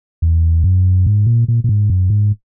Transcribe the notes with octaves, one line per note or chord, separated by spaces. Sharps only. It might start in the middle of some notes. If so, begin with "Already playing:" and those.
E2
F#2
G#2
A#2
A#2
A#2
G#2
F#2
G#2